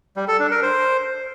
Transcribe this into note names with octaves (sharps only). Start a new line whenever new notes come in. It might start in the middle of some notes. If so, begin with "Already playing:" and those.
G3
A4
D4
A#4
C5